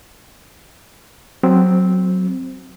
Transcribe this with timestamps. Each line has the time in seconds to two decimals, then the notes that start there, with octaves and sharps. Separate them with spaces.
1.43 F#3 C4